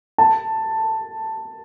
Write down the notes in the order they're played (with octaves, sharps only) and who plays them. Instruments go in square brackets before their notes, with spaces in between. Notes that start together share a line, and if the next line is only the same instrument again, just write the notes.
[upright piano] A5